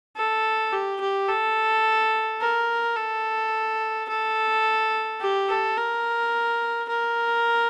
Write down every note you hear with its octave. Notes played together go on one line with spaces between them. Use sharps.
A4
G4
G4
A4
A#4
A4
A4
G4
A4
A#4
A#4